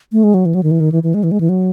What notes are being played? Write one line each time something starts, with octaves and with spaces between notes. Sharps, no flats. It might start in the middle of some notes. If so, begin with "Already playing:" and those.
A3
G#3
F#3
E3
F#3
D#3
E3
D#3
E3
E3
G#3
E3
G#3
E3
F#3